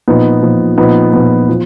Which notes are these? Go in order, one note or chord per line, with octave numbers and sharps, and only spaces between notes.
A#2 F3 B3 D#4
A#2 F3
A#2 F3 B3 D#4
A#2 F3 B3
F3